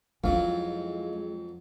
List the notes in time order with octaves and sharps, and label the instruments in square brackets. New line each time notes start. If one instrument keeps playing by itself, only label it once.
[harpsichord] F2 F#3 [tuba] G#3 [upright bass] C#4 E4 [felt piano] F5